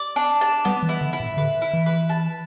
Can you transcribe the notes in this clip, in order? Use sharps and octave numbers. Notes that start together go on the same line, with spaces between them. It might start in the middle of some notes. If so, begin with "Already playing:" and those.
Already playing: D5
D4
A5
G3 B3
E3
E4
D3
E4
A2
D3 B4
E4
E3
B4
A5